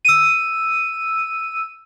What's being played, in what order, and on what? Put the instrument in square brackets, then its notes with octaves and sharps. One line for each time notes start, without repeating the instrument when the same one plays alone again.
[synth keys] E6 D#7